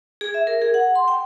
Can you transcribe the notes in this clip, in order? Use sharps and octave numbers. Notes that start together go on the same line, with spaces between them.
G#4
E5
A#4
G#4
F#5
C6
G5